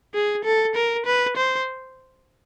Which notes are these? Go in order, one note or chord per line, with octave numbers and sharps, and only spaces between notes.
G#4
A4
A#4
B4
C5